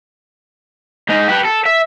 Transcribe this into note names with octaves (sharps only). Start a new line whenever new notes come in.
G#2 D#4
G4 B4
A4
E5